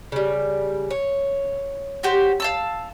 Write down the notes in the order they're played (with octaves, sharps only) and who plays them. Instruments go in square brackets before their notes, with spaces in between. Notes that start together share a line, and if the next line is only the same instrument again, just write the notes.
[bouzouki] C#3 G3
C#5
[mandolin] F#4 G4 C5
F5 A5 E6